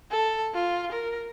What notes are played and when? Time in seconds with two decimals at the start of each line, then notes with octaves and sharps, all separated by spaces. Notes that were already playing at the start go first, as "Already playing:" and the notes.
0.11 A4
0.54 F4
0.92 A#4